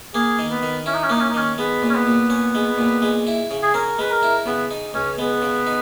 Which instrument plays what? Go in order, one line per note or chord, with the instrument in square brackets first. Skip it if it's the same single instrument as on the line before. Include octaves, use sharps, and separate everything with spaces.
[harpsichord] A#3 [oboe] G#4
[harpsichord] D#3
[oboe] B3
[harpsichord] D#3
[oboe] C#4 [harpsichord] E4
[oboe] D#4
C#4
[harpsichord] A#3 [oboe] D#4
[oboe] C#4
D#4
[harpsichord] D#3 [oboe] C#4
[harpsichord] G#3 [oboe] B3
[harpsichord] A#2
[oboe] C#4
B3
[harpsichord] A#2
C#4
G#3
A#2
G#3
E4
C#3
[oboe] G#4
[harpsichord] C#4 [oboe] A#4
[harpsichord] G#3 [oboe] B4
[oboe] A#4
[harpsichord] E4
[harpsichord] C#3 [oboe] B3
[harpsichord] D#4
[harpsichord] C#2 [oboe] C#4
[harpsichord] G#3 [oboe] B3
[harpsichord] C#3
D#4